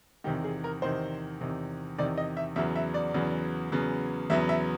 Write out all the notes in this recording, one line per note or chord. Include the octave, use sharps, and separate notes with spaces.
E2 C3 D#3 G4
G#4
A#4
E2 C3 D#3 C5
E2 C3 D#3
E2 C3 D#3 D5
D#5
E5
E2 C#3 F#3 B3 E5
E5
D5
E2 C#3 F#3 B3
E2 C#3 F#3 B3
E2 C#3 F#3 B3 E5
E5